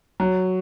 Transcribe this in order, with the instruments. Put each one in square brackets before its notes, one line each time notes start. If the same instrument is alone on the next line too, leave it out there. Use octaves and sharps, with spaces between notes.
[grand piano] F#3